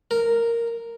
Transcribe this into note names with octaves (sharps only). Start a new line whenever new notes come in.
A#4